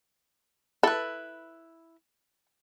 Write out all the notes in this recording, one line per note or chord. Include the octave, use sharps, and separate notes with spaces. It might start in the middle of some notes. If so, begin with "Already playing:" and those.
E4 A4 B4